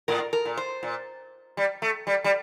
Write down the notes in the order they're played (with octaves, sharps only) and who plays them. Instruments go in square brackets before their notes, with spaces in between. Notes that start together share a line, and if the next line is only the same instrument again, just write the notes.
[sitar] A2 [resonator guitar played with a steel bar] A#4
[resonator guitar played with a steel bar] A#4
[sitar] A#2
[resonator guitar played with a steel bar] C5
[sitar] A#2
G3
A3
G3
G3